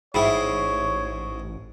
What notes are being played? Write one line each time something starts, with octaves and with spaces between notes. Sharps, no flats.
A1 G#2 E4 G#4 C#5 E5 G5 B5